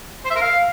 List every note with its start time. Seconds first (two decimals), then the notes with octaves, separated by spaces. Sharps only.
0.25 C5
0.30 E5
0.36 A#4
0.41 F5